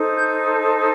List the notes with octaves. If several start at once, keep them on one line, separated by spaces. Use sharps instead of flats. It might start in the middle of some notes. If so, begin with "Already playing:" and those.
Already playing: D#4 A4 C5
G6